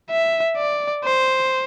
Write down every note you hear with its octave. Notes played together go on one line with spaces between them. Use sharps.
E5
D5
C5